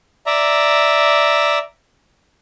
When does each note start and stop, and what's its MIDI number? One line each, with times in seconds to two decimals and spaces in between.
0.26 1.59 74
0.26 1.59 76
0.26 1.59 82